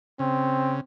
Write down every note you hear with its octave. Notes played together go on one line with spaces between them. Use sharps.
C#3 C4